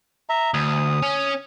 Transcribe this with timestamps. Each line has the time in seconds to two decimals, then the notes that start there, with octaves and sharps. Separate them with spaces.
0.29 E5 A#5
0.54 D2 D#6
1.03 C#4